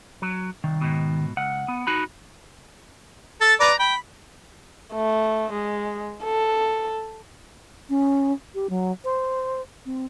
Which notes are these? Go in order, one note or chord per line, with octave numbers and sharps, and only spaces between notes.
F#3
C2 D#3
G#2 B2
C#2 F#5
B3
D#4 F#4 B5
A4 A6
B4 D5 A#5 D6
G5 B5
A3
G#3
A4
C#4
G4
F#3
C5
C4